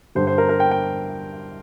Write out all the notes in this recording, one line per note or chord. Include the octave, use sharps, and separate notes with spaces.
G2 D3 G3 C5
C5
A#4
A#4
G5
G5